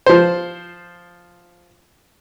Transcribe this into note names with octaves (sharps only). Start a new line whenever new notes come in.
F3 C5